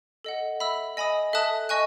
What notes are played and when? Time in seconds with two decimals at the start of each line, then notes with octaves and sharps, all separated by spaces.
0.24 A4 D#5 F#5
0.60 E5 B5 E6
0.97 D#5 G#5 B5 D#6
1.33 A4 E5 A5 D#6 F#6
1.69 D#5 G#5 C#6 F#6